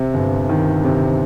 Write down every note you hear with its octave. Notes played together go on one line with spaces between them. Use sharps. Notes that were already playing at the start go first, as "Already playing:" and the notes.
Already playing: C3
G1
D#3
C3